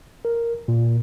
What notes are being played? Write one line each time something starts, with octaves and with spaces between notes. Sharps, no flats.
A#4
A#2